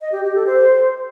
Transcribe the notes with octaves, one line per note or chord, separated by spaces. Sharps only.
D#5
G4
G4
A4
C5